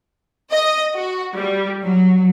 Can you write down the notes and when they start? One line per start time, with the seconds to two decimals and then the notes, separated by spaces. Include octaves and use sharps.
0.51 D#5
0.94 F#4
1.34 G3
1.85 F#3